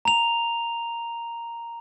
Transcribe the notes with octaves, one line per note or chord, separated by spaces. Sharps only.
A#5 F7